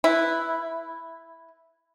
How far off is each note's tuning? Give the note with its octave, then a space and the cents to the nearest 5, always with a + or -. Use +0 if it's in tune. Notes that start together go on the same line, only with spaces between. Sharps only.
E4 +0 B4 +0